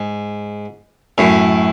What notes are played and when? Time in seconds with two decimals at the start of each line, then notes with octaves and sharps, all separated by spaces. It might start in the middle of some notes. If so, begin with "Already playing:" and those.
Already playing: G#2
1.18 F#2 A2